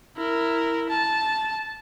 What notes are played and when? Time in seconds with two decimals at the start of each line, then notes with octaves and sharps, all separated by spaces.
0.17 E4 A#4
0.89 A5